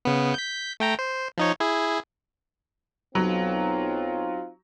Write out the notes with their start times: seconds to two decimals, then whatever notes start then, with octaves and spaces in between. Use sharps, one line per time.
0.05 C#3 B3
0.34 G6 B6
0.80 A3 G5 A#5
0.99 C5
1.38 F3 D#4 C#5
1.60 E4 G#4
3.15 B1 F#3 C4 D#4 F4